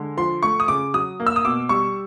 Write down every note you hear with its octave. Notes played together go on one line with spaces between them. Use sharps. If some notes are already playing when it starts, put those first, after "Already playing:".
Already playing: D3 G#3
F3 C6
A3 C#6
D#6
C#3 D6
F#3 D#6
A#3
E6
D#6
B2 D6
G3 C#6